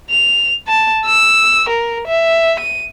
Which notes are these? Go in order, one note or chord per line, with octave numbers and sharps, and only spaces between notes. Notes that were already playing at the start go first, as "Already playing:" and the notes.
F7
A5
E6
A#4
E5
D#7